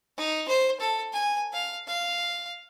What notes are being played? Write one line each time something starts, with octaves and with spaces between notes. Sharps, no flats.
D#4
C5
A4
G#5
F5
F5